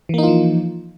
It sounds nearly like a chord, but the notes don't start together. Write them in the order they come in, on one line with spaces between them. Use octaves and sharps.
E3 A#3 D#4 F4 F3